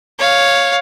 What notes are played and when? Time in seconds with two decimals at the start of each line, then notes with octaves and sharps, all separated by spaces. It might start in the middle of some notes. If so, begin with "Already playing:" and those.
0.19 C#5 F5